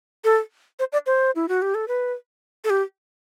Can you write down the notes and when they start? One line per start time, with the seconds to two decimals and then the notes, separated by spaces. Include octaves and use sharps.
0.24 A4
0.79 C5
0.93 D5
1.06 C5
1.36 E4
1.49 F#4
1.62 G4
1.75 A4
1.88 B4
2.64 A4
2.70 G4